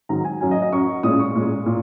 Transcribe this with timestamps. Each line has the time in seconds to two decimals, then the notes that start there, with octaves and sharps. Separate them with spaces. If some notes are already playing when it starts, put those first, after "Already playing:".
0.09 G#2 D#3 F#3 A#5
0.25 G#5
0.40 F#2 F#3 C#4 G#5
0.51 D#5
0.62 D#5
0.72 F#2 F#3 C#4 C#6
1.03 A#2 G#3 C#4 D#6
1.19 C#6
1.35 A#2 G#3 C#4
1.66 A#2